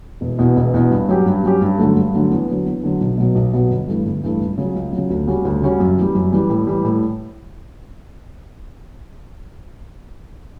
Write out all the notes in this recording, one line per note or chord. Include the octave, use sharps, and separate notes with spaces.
E1
E2 B2
E1
E2 B2
G2
F#3 C#4 G4
G2
F#3 C#4 G4
G2
D3 F#3 A3
G2
D3 F#3 A3
E2
D3 F#3
E2
D3 F#3
B1
B2 F#3 B3
B1
B2 F#3 B3
G1
G2 E3 A3
G1
G2 E3 A3
C#2
C#3 F#3
C#2
C#3 F#3
D2
C#3 G3 C#4 F#4
D2
C#3 G3 C#4 F#4
F#2
E3 G3
F#2
E3 G3
A2
E3 G3
A2